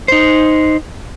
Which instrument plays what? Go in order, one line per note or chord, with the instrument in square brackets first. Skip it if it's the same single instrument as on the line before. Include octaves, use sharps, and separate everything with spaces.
[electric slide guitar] D#4 C5